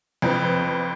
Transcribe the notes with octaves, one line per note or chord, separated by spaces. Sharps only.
F2 F3 B4